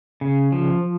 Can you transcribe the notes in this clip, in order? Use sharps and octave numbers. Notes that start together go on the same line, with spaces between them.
C#3
F3